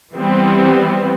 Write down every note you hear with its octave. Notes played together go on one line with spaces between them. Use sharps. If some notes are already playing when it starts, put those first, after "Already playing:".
E3 G3 B3 C4